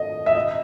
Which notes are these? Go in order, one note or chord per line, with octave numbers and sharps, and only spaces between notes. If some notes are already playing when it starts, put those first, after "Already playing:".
Already playing: D#5
E5
D#5